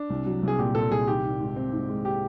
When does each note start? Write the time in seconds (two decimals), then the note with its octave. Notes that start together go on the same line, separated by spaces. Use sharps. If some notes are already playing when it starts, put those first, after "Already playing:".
Already playing: D4
0.10 C2
0.26 F#3
0.43 C2 G#4
0.59 A#2 G4
0.75 A#2 A4
0.91 C2 G#4
1.07 D#3 G4
1.24 D#3
1.40 G#2
1.56 C4
1.72 G#2
1.89 G#3
2.05 G4